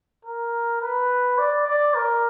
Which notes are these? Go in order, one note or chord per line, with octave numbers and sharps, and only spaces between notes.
A#4
B4
D5
D5
A#4